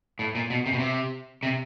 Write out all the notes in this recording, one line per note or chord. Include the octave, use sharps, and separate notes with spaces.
A2
A#2
B2
C3
B2
C3
C3